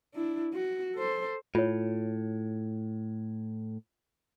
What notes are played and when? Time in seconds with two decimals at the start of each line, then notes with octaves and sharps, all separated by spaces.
0.14 D4 E4
0.53 F#4
0.96 A4 C5
1.55 A2 F4 C#5